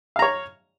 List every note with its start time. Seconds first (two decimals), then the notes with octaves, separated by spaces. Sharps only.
0.16 F5
0.19 A#5
0.22 C#5